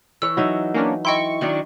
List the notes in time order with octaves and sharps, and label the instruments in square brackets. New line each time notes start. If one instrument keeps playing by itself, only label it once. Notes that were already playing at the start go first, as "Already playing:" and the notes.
[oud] E3 C#5 [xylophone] E6
[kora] F#3 D#4 E5
[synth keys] A#3 C#4 D4
[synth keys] E4 C#6 [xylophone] D#5 G5 C6
[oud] D#3 F#3 D4